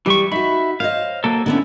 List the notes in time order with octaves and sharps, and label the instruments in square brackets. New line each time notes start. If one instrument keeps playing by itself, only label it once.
[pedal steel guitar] E3 G4 C#6 [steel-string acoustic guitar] G3
[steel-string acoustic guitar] D#4 F#4 [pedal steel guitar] E5 B5
[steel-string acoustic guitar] C5 C#5 D#5 [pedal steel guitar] F5
[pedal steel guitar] F#3 A#3 A4
[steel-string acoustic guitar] D3 B3 C#4 [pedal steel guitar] E4 A4